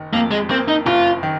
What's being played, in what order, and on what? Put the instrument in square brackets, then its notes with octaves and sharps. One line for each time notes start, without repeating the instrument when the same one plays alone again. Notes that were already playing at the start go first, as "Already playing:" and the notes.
Already playing: [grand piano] F#1 D#3
[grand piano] F2 [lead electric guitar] A#3
[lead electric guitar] G#3
[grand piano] A#3 [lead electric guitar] C4
[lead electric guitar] D#4
[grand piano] F#1 [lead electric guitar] F4
[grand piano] D#3